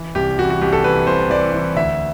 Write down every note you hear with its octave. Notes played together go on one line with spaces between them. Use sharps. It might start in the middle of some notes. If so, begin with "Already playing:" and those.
Already playing: E3
C2 G4
E3 F#4
F#4
C2 G4
A4
E3 B4
C2 C5
E3 D5
E3
D2 E5